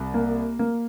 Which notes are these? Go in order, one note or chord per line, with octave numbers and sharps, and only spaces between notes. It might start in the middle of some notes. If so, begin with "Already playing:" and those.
Already playing: C2
A#3
A#3